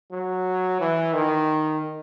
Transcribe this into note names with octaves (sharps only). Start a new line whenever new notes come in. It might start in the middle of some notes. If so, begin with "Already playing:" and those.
F#3
E3
D#3